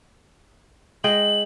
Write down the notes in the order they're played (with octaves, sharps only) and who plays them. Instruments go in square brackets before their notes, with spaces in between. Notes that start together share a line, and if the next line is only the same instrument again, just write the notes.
[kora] G#3 D#5 G5 [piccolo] F#7